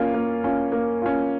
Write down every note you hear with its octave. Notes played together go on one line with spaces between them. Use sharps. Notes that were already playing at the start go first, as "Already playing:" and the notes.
Already playing: A#3 C#4 F4
A#3
C#4 F4
A#3
C#4 F4